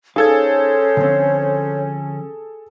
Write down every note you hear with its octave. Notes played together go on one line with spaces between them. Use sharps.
C#4 D#4 G#4 A4 C5 C#5 F5 G#6
D3 F3 C4